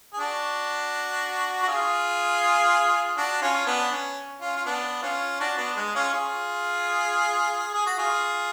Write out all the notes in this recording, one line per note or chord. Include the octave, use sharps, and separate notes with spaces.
G#4
D4 F#4
F#4
F4 G#4
D4 F#4
C#4 F4
B3 D4
C#4
C#4 F4
F4
B3 D4
C#4 F4
D4 F#4
B3 D4
G#3
C#4 F4
F4 G#4
G#4
F#4
F4 G#4